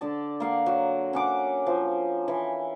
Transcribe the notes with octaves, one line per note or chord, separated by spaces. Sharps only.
D3 D5 A5
A#3 F5 F#5
F#3
C#4 F#5 D6
F3
E3